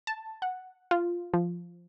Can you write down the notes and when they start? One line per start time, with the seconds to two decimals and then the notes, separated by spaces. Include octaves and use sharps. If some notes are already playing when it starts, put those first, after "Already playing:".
0.07 A5
0.42 F#5
0.91 F4
1.34 F3